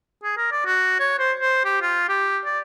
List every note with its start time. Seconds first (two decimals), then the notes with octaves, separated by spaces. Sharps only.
0.23 G#4
0.37 A#4
0.52 D5
0.66 F#4
0.99 C#5
1.19 C5
1.40 C5
1.65 G4
1.82 F4
2.09 G4
2.45 D5